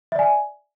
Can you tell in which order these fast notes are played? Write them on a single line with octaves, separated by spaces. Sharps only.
E5 D5 G#5